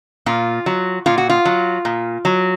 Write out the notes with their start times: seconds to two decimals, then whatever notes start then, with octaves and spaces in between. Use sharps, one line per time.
0.26 A#2 F4
0.66 F#3
1.06 A#2 F4
1.18 F#4
1.30 F4
1.45 F#3
1.85 A#2
2.25 F#3